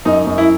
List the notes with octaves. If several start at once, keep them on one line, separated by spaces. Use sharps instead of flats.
F#2 D#4
F#2
E4